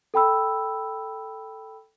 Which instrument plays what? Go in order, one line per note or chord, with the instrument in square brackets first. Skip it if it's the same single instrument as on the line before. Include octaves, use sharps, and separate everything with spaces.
[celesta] A4 G5 B5 E6